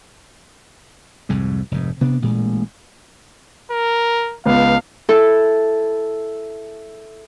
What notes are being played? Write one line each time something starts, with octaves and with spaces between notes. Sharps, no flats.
C2 F2 G#2
F1 G#2
C3 B3 D4
A1 A#2 G#3
A#4
C#2 B3 F5
E4 A4